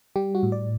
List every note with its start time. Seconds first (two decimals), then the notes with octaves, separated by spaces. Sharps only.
0.16 G3 G4
0.35 F#4
0.43 A2
0.52 D5